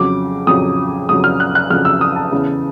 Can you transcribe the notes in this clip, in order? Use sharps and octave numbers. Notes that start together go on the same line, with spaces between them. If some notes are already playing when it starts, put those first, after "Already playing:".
Already playing: F2 C#3 F#3 D6
F2 C#3 F#3 D#6
F2 C#3 F#3 D#6
F6
F#6
F#6
F2 C#3 F#3 F6
E6
D#6
A5
E2 C#3 E3